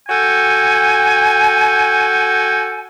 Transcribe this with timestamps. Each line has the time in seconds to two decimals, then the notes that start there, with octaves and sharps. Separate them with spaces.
0.09 F#4 A4 G5 G#5